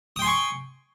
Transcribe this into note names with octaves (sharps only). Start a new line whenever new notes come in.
G5 G#5 C6 C#6 D#6